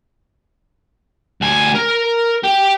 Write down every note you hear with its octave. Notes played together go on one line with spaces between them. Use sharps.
D2 G#5
A#4
G4